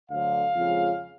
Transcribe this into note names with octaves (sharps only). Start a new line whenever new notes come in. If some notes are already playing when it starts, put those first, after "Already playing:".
D2 D3 F#3 F5
F2 C#3 F3 G#3 C#4